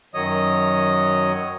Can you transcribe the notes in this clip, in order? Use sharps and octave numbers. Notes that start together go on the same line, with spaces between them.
F#2 D#3 F#3 C#5 D#5 D#6